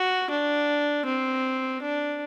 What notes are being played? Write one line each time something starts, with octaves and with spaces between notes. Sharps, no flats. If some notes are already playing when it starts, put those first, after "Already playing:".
Already playing: F#4
D4
C4
D4